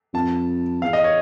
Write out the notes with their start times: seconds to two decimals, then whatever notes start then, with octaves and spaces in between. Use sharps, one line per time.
0.14 F2 A5
0.82 E2 F5
0.93 D#5
1.04 C#5